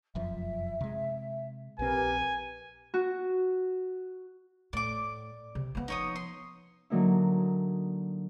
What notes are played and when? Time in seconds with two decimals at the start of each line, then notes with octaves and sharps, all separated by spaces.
0.15 F1 F#2 F3 E5
0.81 C3 G#3
1.79 A#1 C4 G4 A#4 B4 G#5
2.94 F#4
4.73 A2 D5 D6
5.55 C3
5.75 F3 B3
5.88 D#4 C#5 D#6
6.16 C6
6.90 D3 F#3 A#3 D#4 E4